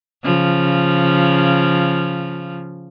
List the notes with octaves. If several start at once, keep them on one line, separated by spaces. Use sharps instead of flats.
C#3 F3